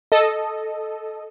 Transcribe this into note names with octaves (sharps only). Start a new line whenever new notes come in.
A4 D#5